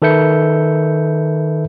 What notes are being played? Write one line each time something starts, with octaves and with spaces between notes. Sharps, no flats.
D#3 A4 B4 E5 G6 C#7